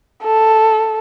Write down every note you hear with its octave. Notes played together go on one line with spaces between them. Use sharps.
A4